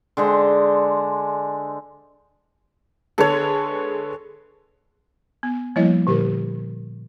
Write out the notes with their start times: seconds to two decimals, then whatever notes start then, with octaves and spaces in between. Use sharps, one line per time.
0.17 D3 G#3 C5
3.18 D3 G#3 B3 A4 C#5
5.43 B3
5.76 F3 G3 A#3 E4 C#5 D#5
6.07 A#2 D3 G4 A#4